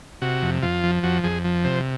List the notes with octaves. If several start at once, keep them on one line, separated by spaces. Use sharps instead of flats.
C3 F#4
F2
F2 F4
F3
F2 F#4
F2 G#4
F3
C3 C5